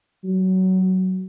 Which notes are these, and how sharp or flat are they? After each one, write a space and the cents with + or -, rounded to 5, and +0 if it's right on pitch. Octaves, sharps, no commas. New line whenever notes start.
F#3 +15